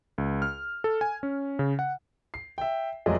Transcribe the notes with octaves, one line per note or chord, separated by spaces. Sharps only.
C#2
F6
A4
G#5
C#4
C#3
F#5
C7
E5 G5
F1 F2 F#3 G#3 D5 D#5